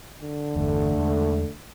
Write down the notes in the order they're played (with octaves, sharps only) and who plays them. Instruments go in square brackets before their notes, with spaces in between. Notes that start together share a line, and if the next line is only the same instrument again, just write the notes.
[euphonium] D3
[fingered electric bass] G1 E2 [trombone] A3
[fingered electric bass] E2 G#3